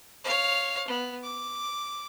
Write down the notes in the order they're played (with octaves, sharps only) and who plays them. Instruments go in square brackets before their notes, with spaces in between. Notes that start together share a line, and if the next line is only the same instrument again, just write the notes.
[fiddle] C#5 F5
B3
D6